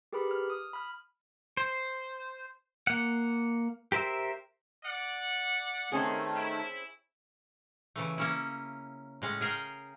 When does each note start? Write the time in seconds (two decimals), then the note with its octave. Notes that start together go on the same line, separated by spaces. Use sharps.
0.13 G4 G#4 A#4 B4 B5 D6
0.31 F6
0.50 D#6
0.73 B5 F6
1.57 C5
2.87 A#3 F#5
3.92 G4 A#4 C5 E5 E6
4.85 D5 F#5
5.92 D#3 A3 C4 C#4 G#4
6.35 E4
7.96 C#3 E3 A3
8.18 A#3 C#4 E4
9.22 A2 G#3 C#4
9.41 G#4 A#4 F5 G5